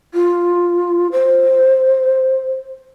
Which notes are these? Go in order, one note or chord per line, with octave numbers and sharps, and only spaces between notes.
F4
C5